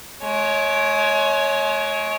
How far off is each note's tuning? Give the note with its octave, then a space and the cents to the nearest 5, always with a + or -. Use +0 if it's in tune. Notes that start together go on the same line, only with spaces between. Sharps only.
G#3 +35 C#5 +0